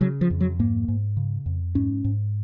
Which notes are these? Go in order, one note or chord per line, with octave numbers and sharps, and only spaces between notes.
C#3 F#3
F3
F2
F#3
G#2 A#3
G#2
C#3
F2
G#2 C#4
G#2